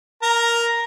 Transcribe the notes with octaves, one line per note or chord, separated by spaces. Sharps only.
A#4 A#5